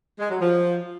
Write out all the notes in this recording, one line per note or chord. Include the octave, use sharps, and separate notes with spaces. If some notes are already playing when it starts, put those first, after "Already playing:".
G#3
F#3
F3